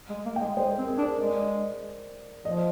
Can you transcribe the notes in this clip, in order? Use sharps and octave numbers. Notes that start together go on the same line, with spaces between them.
G#3
A#3
G5
G#3
G#3 C5
A#4
C4
G#4
D4
A#4
G#3 D5
F3 D#5